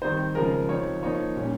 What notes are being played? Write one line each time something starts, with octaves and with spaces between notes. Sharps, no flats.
D#3 G3 C4 D#4 C5
C#3 F3 G#3 A#4
C3 F3 C4 D#4 C#5
F3 A#3 D#4 C#5
A#2 G3 C#4